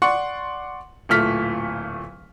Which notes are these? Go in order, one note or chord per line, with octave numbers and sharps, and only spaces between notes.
D5 F#5 C6 C#6
D1 A#2 A3 F6 B6